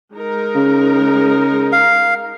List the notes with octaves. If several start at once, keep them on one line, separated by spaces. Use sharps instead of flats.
G#3 D#4 A#4
C#3
F5